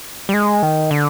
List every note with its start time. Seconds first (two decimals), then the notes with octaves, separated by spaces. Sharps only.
0.29 G3
0.34 G#3
0.63 D#3
0.91 D3